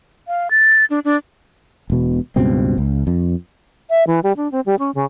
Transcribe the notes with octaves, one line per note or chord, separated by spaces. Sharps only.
F5
A6
D4
D4
E1 B2
C#2 G2 B2 C4
C#2
F2
E5
E3
G3
D4
C4
G3
C#4
C#3